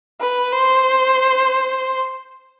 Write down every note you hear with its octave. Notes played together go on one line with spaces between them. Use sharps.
B4
C5